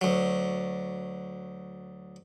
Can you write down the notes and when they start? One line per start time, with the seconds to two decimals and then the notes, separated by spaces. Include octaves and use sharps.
0.01 D2 F#3